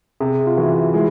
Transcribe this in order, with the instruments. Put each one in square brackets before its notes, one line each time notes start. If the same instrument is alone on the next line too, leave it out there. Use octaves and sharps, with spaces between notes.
[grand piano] C3 [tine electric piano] G#4
[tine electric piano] F4
[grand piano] E3 [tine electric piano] F#4
[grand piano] G#3 [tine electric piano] E4